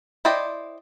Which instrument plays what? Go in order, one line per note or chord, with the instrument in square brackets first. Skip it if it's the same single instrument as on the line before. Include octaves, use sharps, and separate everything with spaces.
[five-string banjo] E4 C5 D5 D#5 G5